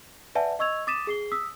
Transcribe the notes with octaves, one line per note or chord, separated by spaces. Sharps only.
B4 D5 E5 F#5 G#5 A5
D#5 C#6 E6 G#6 F7
D6 D#6 A6 B6 D#7 E7
G#4 C7 G7
D#6 E6 B6